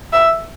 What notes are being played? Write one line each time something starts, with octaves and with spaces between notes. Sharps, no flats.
E5